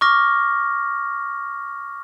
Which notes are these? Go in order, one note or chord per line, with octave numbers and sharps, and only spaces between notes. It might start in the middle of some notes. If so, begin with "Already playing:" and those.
C#6 D6 F6 A#6